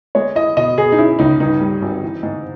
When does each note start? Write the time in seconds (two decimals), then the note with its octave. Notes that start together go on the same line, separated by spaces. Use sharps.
0.15 G#3 C#5
0.35 E4 D#5
0.57 B2 D#5
0.78 B2 G#4
0.92 D#4
0.98 C#4 E4
1.19 C#2 D#4
1.40 G2 D#4
1.61 G3
1.82 G#1
2.02 E3
2.23 G#2